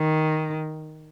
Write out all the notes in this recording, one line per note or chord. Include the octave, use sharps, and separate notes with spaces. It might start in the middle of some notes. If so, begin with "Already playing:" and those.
Already playing: D#3